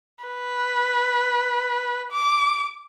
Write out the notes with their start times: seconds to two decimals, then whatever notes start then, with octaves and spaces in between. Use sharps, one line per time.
0.25 B4
2.12 D6